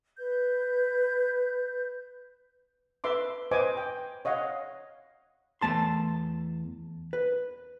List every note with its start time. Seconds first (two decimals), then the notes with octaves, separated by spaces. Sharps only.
0.18 B4 G6
3.04 B4 E5 C6 D6
3.51 B4 C5 D#5 G#5 D6
3.77 G5
4.25 C#5 D#5 F5 F#5
5.61 E2 A3 A5 C6
7.13 B4